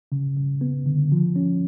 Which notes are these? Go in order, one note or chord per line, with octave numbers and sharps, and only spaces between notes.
C#3
C#3
B3
D3
F3
C#4